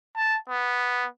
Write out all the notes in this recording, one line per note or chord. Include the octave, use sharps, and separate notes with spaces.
A5
B3